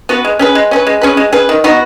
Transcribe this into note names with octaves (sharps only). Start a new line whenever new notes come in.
B3 F#4 B4
G#3
C#4 G#4 B4
G#3
C#4 G#4 B4
G#3
C#4 G#4 B4
G#3
C#4 G#4 B4
D#3
B3 D#4 F#4